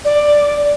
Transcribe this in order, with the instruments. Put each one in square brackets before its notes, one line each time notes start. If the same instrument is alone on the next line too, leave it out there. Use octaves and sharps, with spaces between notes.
[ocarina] D5